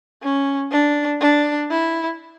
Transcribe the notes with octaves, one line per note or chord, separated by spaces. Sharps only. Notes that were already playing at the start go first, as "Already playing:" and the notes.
C#4
D4
D4
E4